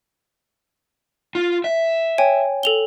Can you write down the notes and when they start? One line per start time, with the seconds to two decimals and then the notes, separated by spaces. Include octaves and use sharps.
1.35 F4
1.64 E5
2.18 C#5 G5 G#5
2.63 A4 F7 G7